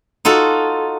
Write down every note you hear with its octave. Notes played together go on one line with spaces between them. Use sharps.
D#4 F4 F#4 A4